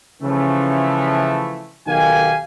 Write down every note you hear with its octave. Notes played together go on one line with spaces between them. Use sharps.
C#3 E3 F3 A3
B1 D#3 G4 F5 G#5